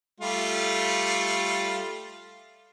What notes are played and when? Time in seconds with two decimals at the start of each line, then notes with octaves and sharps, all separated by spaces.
0.20 G3 A3 F4